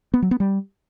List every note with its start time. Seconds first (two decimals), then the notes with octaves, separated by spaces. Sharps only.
0.14 B3
0.22 F#3
0.31 B3
0.40 G3